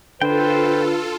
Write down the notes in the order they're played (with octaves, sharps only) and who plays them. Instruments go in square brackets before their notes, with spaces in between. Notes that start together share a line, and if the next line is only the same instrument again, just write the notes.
[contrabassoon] D3 [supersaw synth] F4 A4 [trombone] B4 [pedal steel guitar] C5 G5